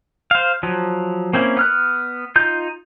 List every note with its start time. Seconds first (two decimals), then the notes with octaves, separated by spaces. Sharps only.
0.31 C5 F5
0.63 F3 F#3
1.33 A#3 C4 C#4 E4
1.57 B3 F6 F#6
2.36 D#4 F4 G6